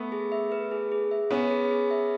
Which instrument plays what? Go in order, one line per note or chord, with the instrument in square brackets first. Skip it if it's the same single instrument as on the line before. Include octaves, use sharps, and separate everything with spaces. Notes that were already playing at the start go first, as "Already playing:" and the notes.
Already playing: [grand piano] A3 B3
[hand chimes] G#4
E5
B4
G#4
G#4
E5
[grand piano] B3 C#4 [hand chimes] B4
[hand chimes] G#4
G#4
E5